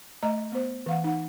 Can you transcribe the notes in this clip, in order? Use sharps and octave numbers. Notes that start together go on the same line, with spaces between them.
A3 D#5 A#5
B3 C5
E3 F5 F#5
D#4 F#5